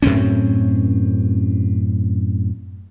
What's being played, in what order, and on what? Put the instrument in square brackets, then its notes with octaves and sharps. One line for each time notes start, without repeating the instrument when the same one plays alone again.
[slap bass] F#2 A2 C4 C#4